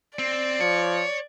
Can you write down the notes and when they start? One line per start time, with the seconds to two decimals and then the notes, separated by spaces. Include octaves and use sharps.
0.19 C4 D5
0.60 F3 C#5